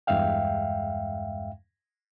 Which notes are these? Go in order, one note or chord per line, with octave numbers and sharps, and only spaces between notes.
E2 G2 G#3 E5 F5 G5